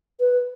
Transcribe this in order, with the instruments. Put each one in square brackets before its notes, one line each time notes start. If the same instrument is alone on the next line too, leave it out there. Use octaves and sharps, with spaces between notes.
[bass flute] B4